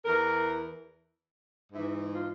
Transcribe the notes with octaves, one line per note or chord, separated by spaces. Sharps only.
E2 E3 A#4
G#2 E3 E5
F4